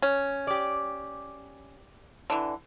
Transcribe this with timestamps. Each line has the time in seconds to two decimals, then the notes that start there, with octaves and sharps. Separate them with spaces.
0.02 C#4
0.47 G4 D5
2.30 D3 E3